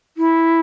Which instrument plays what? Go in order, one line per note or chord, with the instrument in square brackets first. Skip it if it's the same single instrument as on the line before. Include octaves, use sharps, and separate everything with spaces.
[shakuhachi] E4